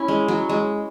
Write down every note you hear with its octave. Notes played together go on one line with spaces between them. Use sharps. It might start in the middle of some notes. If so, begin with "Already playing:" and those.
Already playing: C#4 E4
G#3
F#3
G#3